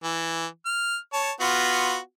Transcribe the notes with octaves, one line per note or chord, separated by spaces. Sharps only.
E3
F6
C#5 A5
B3 F4 F#4